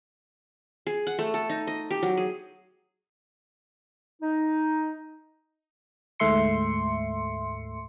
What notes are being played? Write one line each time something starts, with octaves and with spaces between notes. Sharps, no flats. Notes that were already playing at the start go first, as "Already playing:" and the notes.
G#4
F#5
A3
A4
D#4
D#5
G4
F#3
G#4
D#4
D2 G#2 A3 E5 C6 C#7